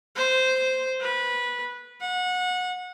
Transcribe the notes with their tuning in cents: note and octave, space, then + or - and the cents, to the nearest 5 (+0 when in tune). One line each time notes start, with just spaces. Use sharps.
C5 -10
B4 -15
F#5 -25